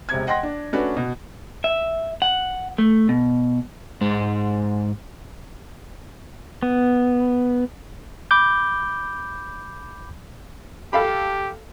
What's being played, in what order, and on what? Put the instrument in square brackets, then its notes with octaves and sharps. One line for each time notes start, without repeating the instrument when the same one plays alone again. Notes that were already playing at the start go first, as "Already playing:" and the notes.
[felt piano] E1 C3 G#6
D#5 F#5 G5 C6 A#6
D4
A3 C#4 D4 F#4 B4
B2
[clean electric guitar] E5
F#5
A3
B2
[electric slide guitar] G#2 G#3
[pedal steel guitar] B3
[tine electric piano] B5 D6 G6
[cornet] G4 [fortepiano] A4 F5 B5